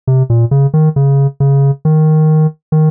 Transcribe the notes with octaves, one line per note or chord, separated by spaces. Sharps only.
C3
A#2
C#3
D#3
C#3
C#3
D#3
D#3